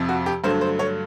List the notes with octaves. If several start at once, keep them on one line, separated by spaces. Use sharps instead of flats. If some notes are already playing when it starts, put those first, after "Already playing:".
Already playing: F2 C3 F3
F#4
G4
G2 D3 F#3 A3 C5
C5
C#5